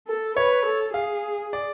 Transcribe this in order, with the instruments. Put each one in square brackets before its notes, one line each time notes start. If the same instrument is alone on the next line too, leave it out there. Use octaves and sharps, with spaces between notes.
[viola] A4
[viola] B4 [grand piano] C#5
[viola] A4
[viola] G#4 [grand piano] F5
[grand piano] D5